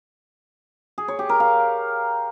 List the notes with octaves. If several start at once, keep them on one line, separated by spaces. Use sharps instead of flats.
G#4
C#5
G4
A#4
F5